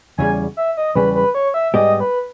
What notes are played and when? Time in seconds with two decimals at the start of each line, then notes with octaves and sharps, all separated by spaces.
0.18 E2 C#3 G3 G#5
0.57 E5
0.77 D#5
0.95 E2 C#3 G3 B4
1.15 B4
1.35 C#5
1.54 E5
1.74 G#2 G3 B3 G4 D#5
2.00 B4